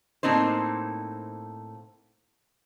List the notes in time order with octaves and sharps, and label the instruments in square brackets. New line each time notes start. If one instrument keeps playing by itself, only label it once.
[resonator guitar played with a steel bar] A2 A#3 C4 D#4 C5